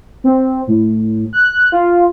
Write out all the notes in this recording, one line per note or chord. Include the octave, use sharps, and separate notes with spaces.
C4
A2
F#6
F4